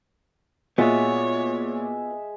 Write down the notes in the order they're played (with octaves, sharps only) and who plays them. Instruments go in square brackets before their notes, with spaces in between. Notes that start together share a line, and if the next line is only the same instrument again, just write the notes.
[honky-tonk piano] A#2 [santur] G#3 E5 [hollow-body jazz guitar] B3 F4 F#4 [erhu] C#5